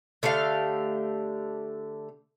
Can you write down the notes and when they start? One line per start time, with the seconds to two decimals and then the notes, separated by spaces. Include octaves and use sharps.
0.23 D3 A3 G4 F5